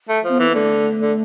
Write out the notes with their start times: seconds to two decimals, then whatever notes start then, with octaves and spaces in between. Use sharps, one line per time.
0.09 A3
0.25 F3 C4
0.33 B3
0.40 E3
0.50 B3
0.55 D3 A3
1.02 D3